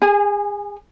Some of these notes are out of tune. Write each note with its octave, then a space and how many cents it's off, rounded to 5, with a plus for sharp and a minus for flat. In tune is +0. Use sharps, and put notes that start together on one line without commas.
G#4 -35 G#5 +0